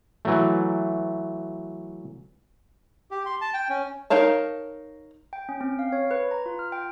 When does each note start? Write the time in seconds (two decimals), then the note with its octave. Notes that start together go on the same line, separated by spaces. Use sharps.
0.25 E3 F#3 A3
3.11 G4
3.26 C6
3.41 A5
3.54 G5
3.69 C#4
4.10 D#4 A#4 C#5 F5 A5
5.33 G5
5.49 C#4
5.61 C4
5.79 F5
5.92 C#5
6.11 B4
6.31 A#5
6.46 F4
6.59 F6
6.72 G5